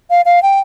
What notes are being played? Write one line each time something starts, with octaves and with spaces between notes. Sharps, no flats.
F5
F5
G5